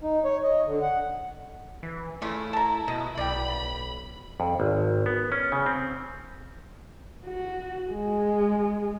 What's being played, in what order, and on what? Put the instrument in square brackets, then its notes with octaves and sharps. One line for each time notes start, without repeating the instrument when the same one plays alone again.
[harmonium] D#4
C#5
D#5
D3
F#5
[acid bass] E3
[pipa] C#3 F4 C#6 [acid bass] A3 [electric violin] E4
[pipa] A5 A#5
[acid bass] B2 [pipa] D#5
[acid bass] B1 [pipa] D5 G5 [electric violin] B5
[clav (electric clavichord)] F2
G#1
B3
C#4
C#3
C4
[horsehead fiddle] F#4
G#3